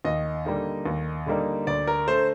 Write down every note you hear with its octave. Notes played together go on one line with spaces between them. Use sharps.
D#2 D#5
D3 G3 A#3 D#4
D#2
D3 G3 A#3 D#4
D2 D5
A#4
D3 A3 C5